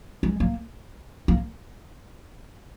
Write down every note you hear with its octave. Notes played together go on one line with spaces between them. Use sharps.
G#3
A#3
A#3